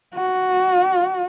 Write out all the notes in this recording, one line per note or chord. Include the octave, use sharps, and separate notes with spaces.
F#4